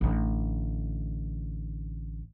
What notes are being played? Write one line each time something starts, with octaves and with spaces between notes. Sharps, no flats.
A1 D3